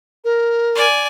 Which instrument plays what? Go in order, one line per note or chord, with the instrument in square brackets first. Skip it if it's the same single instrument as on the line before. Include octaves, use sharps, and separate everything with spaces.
[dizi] A#4
[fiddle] D5 G#5